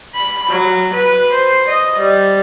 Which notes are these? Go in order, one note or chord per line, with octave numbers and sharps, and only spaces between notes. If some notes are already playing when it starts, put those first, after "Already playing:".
B5
F#3
B4
C5
D#5
G3